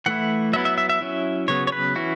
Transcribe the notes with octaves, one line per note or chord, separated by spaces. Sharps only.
E3 A3 E4 F#5
F#3 B3 E4 E5
E5
E5
E5
F#3 C#4 E4
C#3 F#3 B3 C#5
C#5
B4
E3 C#4 E4 F#4